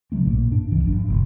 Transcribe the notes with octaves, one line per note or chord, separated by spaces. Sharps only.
C#3 F#3 A3 C4
A#1 A2 A#3
G2 D4
C2 E3 D4
G#1 G2 F3 D4
F#1 A#2